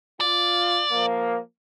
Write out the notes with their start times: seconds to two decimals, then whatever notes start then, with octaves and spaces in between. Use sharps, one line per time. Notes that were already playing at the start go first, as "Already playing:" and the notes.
0.21 F4 D5
0.92 F3 A#3